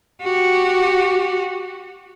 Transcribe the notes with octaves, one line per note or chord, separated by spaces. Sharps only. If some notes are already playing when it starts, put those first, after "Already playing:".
F#4 G4